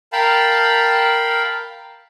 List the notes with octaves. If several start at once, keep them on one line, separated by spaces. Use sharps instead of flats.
A#4 F5 G5 A5 B5